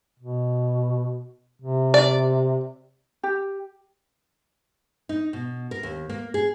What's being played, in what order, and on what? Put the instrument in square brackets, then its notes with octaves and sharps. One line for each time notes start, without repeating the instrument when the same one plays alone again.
[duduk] B2
C3
[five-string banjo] D5
[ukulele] G4
[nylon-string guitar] D#4
B2
A#4
D#2
A#3
G#4